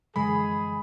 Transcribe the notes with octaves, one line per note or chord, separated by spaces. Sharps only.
F#2 D3 E3 G#3 G#4 B5